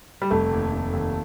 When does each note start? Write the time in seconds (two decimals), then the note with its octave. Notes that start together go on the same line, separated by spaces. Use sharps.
0.22 G3
0.30 F1 A3
0.52 D#2
0.72 F1
0.93 D#2